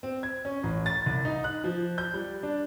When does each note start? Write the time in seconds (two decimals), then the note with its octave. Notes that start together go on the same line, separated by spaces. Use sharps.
0.03 C4
0.23 G#6
0.45 C#4
0.63 A1
0.86 A6
1.06 C2
1.25 D#4
1.44 F#6
1.64 F3
1.98 G6
2.14 G3
2.43 D4